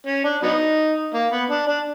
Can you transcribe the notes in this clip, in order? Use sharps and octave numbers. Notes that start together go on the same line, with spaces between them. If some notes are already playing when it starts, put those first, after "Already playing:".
C#4
D4
F#3 B3 D#4
A#3
B3
D4
D4